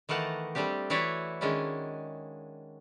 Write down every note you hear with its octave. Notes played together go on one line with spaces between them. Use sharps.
D#3 E3 A3 A#4 F#5 A5
G3 A3 C4 D4 G4
E3 E4 F#4 C#5 D5 E5
D#3 G#3 C#4 D4 E4